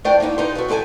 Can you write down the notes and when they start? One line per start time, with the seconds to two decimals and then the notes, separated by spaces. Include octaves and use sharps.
0.04 A3 D4 F4 C5 D5 G5
0.20 A#3 B3 D#4 E4
0.38 D#4 F4 G4 B4 C5
0.55 C#3 A3 F#4
0.69 C#3 C4 A4 D#5 G#5